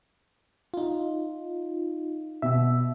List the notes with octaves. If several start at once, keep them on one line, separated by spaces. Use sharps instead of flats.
D#4 F4
B2 E5